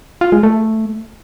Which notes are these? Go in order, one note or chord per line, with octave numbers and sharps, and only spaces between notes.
F4
G#3
A3